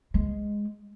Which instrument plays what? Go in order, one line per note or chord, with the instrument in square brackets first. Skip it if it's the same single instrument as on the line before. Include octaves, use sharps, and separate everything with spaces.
[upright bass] G#3